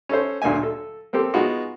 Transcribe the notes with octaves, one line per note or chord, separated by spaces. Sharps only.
C#4 A4 C5
D2 A#2 D3 E5 G#5
A4
A#3 C4 G4 A4
G#3 B3 D#4 F4 F#4